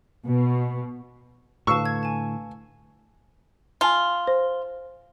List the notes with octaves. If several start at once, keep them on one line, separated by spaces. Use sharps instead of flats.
B2
A2 D3 B4 F5 A5 C#6 E6
G#6
G#5 A5
F4 G#5 A5 F6
C5